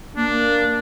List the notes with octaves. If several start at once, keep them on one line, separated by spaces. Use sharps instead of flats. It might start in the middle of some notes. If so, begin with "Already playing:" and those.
A#3 D4